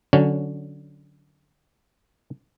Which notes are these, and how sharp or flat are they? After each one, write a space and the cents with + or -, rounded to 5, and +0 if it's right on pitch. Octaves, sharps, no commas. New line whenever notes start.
D3 +0 F#3 +0 C#4 +15